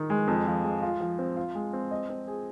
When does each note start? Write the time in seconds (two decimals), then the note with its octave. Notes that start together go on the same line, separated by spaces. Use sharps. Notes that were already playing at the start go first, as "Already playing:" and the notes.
Already playing: D#3 D#4
0.10 G#3
0.27 F2
0.47 F3
0.64 G#3
0.82 F4
1.00 F3
1.19 C4
1.36 F4
1.55 G#3
1.73 C4
1.91 D#5
2.09 C4
2.27 G#4